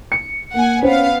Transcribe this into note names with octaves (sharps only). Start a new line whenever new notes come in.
C#7
A#3 F#5 G#5
B3 C#4 C5 F5